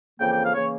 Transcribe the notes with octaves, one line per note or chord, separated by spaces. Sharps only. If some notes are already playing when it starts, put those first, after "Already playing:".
F2 C#3 E3 A#3 G5
G5
F5
C#3 E3 A#3 C#5